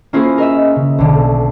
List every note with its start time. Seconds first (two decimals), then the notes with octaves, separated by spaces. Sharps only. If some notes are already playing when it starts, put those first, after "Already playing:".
0.13 A#3 C#4 E4 F4 G#4 C5
0.38 A#4 D#5 E5
0.76 C#3
0.98 B1 D3